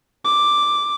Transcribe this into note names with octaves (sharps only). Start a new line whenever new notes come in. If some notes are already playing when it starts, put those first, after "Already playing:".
D6